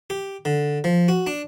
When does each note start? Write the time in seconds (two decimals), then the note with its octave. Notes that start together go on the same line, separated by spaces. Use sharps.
0.10 G4
0.45 D3
0.84 F3
1.08 F#4
1.27 D4